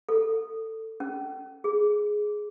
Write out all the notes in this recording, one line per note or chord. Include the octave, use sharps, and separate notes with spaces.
A4
C#4
G#4